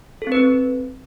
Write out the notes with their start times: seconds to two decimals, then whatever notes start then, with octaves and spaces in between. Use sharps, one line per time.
0.22 A4
0.27 C4
0.32 B4
0.37 C4